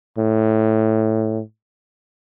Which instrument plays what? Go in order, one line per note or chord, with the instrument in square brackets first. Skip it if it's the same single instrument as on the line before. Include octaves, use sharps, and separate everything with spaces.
[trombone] A2